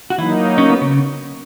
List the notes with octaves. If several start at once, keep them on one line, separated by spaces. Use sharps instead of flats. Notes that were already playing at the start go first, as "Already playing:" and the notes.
F#4
E3 F#3 A#3 D#4 E4
C#4
B3
C#3 C#4